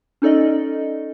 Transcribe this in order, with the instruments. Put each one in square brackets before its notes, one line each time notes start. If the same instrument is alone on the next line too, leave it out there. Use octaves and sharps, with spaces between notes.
[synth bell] C#4 D#4 A4 D5 D#5